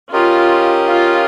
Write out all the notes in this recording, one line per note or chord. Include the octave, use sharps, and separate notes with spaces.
C#4 F4 G4 A#4 D#5
F4